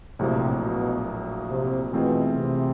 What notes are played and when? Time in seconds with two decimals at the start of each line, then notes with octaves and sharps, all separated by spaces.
0.19 A#1 A2 C3 F#3 A#3
0.63 B2
1.49 C3
1.92 B2 E3 A3 C4 F4 G#4
2.35 C3